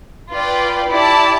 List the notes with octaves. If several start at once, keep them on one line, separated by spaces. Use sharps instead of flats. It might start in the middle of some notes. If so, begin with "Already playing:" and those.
F4 B4 D5 G5
E4 G4 D5 A5